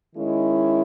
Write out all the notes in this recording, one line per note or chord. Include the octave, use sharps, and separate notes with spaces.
D#3 G#3 C#4 E4